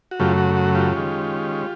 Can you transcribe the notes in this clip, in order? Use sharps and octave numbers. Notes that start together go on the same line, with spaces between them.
F#4
F#2 C#3 F#3 A3 F4 G4
F#4
F#4
F4 G4
D#3 G#3 C#4